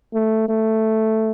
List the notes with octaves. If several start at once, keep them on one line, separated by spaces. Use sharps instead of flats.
A3
A3